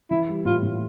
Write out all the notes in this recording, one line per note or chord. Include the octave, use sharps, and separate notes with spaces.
E3 E4
G3
A2 F4
A2